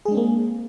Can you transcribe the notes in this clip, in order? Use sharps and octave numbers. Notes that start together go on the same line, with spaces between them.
G#3 A#3 C4 D4 G#4